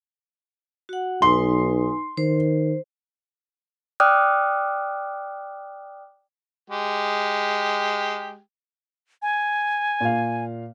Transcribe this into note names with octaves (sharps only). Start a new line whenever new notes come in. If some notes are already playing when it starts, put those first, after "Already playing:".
F#4 F#5
B1 D#4 B4 G#5 C6
D#3 C5
D5 G5 D6 D#6 F6 F#6
G#3 G4
G#5
A#2 F5